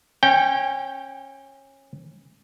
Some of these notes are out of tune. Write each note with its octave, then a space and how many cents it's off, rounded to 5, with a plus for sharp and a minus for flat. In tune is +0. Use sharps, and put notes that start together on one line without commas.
C#4 -25 G5 +0